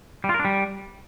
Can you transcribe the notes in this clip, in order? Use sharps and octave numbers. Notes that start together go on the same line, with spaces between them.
G3
F4
A#4
D4
G3